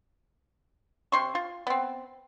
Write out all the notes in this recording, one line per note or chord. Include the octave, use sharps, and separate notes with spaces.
C3 C6 C#6
F4
B3 C4